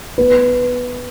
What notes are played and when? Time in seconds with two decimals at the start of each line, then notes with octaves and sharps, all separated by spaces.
0.18 B3 B4